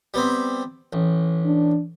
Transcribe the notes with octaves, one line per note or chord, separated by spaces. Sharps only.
G3 B3 C4
A1
D4